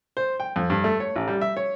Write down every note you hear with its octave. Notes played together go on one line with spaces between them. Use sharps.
C5
G5
F2
G2
A3
C#5
A1
G3
E5
C#5